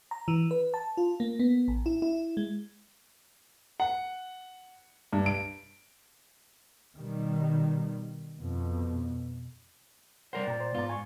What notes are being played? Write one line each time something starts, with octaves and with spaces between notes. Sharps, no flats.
A#5
E3
B4
A5
F4
A#3
B3
A1
E4
E4
G#3
F#5
G2
D7
B2 D#3 G3
F2 B2
G3 A#4 C5 D5 F#5
A#2 G5 A#5
C5
G#2 B3 F4 A#5
G#5 C#6